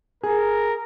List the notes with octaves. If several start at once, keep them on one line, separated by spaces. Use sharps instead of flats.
G#4 A#4